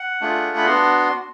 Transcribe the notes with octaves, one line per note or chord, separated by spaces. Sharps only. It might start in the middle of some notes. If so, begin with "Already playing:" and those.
Already playing: F#5
A3 D4 F4 G#4
B5
B3 D4 F#4 C6